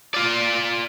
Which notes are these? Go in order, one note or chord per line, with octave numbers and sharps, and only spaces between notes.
F4 D5